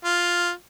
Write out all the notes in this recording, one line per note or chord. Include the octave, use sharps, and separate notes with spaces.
F4